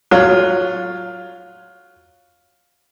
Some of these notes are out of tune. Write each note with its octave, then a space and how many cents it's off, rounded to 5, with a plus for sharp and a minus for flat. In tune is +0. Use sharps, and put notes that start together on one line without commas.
F#3 +0 F4 +10